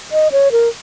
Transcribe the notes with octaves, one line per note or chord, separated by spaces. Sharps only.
D#5
C#5
A#4